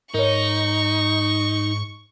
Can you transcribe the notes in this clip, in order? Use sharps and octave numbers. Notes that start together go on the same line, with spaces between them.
G#2 D#4 A#4 C#5 C#6